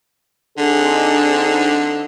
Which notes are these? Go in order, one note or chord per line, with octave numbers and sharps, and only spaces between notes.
D3 C4 D4 D#4 G#4